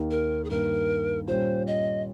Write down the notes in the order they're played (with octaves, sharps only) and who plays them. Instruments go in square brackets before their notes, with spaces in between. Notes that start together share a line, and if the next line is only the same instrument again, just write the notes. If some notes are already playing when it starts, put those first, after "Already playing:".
Already playing: [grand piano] D#2 D#3 A#3 D#4 G4
[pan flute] A#4
G#4
[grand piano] G2 D#3 A#3 [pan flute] A#4
[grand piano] A#2 G3 C#4 [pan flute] C5
[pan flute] D#5